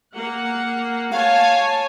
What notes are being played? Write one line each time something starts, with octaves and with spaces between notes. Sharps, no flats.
A#3 F#5
C#5 F5 G#5 A5